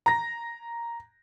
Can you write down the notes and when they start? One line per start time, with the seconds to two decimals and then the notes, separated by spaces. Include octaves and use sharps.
0.06 A#5 A#6